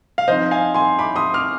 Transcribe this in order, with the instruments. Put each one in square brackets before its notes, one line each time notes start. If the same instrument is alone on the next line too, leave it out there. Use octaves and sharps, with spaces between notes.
[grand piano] F5
F3 C4 D#4 C5 D#5
F5 G#5
G#5 C6
B5 D6
C6 D#6
D6 F6